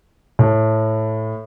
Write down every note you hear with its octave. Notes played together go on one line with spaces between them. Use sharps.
A2